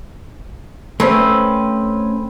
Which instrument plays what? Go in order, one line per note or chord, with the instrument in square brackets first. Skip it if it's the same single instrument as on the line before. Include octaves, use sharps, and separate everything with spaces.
[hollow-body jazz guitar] A3 C#4 [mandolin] C4 B4